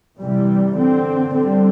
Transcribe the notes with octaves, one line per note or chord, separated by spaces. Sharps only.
C3 E3 G3
D3 C4
D3 G3 C4